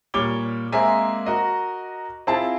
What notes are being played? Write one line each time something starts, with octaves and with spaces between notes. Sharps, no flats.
A#2 G3 C#5 D6 G7
G#3 A#3 C4 A#4 E5 G#5
F#4 A#4 D#5
C4 E4 F4 G#4 A5